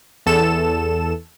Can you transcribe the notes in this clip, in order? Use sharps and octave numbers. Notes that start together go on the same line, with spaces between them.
E2 A4 E7